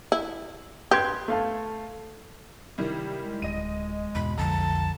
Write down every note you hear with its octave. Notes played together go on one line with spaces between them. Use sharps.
E4
G4 B4 C6 G#6
A3 F5 A5
C3 D#3 G3 E4
G#3
D1 D#5 D#7
E2 G#2 B2 B5
B1 F2 D3 F3 A5 A#5